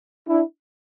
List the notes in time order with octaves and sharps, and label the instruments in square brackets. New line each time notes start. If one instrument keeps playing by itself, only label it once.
[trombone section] D4 E4